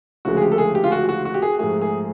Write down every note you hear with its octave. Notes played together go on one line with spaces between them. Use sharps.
D2 C#3 F3 G#3 F#4
G#4
G4
A4
G#4
G4
F4
F#4
F#4
F#4
G4
G#4
G#2 F3 A3 G#4
G#4